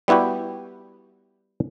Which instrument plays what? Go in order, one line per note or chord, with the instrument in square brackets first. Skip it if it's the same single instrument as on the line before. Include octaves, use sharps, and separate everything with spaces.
[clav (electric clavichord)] G3 B3 E4 F#4 G4